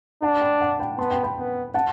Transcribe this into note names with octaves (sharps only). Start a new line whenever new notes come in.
D4 F#5 A5
G5 B5
F#5 A5
G5 B5
B3 A5 C6
G5 B5
G5 B5
B3
F#5 A5